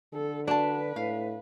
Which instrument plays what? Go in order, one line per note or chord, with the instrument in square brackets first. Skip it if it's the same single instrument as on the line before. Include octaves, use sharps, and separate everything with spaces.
[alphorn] D3 [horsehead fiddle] A4
[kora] D4 [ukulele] F#4 A5 [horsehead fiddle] B4
[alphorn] A2 [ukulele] F5